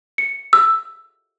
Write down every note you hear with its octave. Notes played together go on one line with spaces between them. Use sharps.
C#7
E6